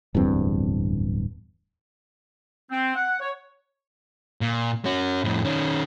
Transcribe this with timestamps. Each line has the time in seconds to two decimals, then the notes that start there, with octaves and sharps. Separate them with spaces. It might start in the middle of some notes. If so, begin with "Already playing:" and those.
0.15 D1 E2 G2 C4
2.71 C4
2.95 F#5
3.20 C#5
4.41 A#2
4.85 C#4 F#4
5.24 F2 A2
5.45 D#3 C#4